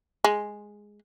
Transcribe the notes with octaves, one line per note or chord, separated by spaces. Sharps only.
G#3